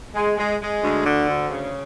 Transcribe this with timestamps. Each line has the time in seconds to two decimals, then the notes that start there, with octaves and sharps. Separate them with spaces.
0.14 G#3
0.37 G#3
0.60 G#3
0.81 D2
1.04 D3
1.27 D2
1.49 C#3